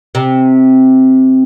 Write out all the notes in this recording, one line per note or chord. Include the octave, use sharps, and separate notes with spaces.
C3